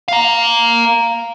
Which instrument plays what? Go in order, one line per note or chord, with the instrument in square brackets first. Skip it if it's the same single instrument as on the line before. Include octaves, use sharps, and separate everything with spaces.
[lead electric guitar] F5 A#5